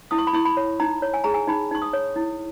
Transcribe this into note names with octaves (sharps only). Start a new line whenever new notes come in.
E4 D#6
C#6
B5
E4 C#6
B5
C#5
D#4 A#5
C#5
G#5
G#4 A#5
G#5
D#4 B5
D#4 C#6
D#6
C#5
E4